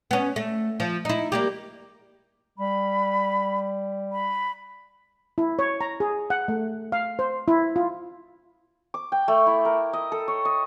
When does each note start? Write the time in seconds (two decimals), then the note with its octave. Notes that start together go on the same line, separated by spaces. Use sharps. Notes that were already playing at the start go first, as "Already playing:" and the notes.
0.11 B3 C#4
0.36 A3
0.80 F3
1.05 D#4 E4
1.32 G3 A#3 G4
2.59 G3 B5
4.12 B5
5.38 E4
5.59 C#5
5.81 A#5
6.00 G#4
6.30 F#5
6.48 A3
6.92 F5
7.19 C5
7.48 E4
7.76 F4
8.94 D6
9.12 G5
9.28 A3
9.47 E4
9.65 A#4
9.93 D#5
10.12 A4
10.28 C#5
10.45 D#5